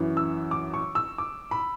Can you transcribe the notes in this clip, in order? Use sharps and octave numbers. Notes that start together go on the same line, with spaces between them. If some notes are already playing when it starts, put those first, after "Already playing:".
Already playing: F#2 E3
E6
D6
C#6
E6
D6
B5